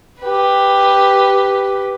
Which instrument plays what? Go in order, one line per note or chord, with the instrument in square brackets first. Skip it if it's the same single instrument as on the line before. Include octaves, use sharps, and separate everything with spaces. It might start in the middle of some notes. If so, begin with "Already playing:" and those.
[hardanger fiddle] G4 B4